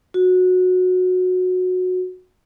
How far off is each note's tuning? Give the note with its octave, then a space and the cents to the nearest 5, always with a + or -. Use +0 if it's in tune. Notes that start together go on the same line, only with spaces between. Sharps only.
F#4 -15